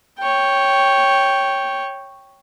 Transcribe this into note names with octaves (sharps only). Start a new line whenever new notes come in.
C#5 G5